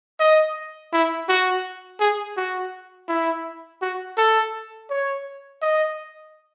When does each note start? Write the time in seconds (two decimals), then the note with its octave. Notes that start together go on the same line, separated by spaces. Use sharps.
0.20 D#5
0.93 E4
1.29 F#4
2.00 G#4
2.37 F#4
3.09 E4
3.82 F#4
4.18 A4
4.90 C#5
5.62 D#5